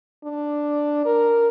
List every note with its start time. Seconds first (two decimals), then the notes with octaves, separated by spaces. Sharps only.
0.24 D4
1.06 A#4